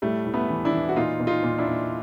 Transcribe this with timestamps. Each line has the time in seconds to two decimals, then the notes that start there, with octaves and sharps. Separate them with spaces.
0.02 A2 G3 A3
0.26 A2
0.34 A3 B3
0.49 E3
0.65 D4 E4
0.72 E3
0.89 F#4
0.96 A#2 D#4 F4
1.20 A#2
1.27 D#4 F4
1.43 A#2
1.58 D4 E4
1.67 A#2